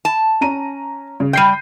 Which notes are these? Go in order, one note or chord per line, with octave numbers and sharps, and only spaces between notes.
A5
C#4 A#5 D#7
C#3
G3 G5 G6 C7 D#7